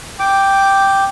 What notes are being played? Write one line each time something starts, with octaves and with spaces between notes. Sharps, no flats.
G5 D6